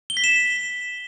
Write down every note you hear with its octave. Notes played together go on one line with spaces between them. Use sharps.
G7
B6
E7